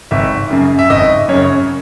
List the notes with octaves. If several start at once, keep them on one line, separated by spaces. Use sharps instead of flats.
G#1 E5
F#2 C#3
E5
G#1 D#5
F#2 C#3 C#5